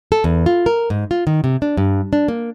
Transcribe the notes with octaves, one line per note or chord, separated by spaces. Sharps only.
A4
E2
F4
A#4
G#2
F4
D#3
C3
D4
G2
D4
A#3